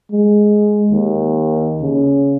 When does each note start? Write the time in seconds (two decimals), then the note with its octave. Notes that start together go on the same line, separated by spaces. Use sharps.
0.11 G#3
0.91 D#2
1.82 C#3